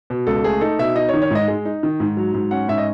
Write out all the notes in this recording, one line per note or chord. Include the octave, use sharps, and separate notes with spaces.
B2
C#2 A4
A3 G#4
D#4 A4
B2 E5
D#4 D#5
C#5
D#3
C#5
G#2 D#5
G#3
D#4
D#3
G#2
F#3
G#2
C#4 F#5
G#2 E5
D#5